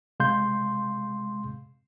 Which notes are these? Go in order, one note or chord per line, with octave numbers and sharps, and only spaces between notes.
C3 G#3 F5 C6 G6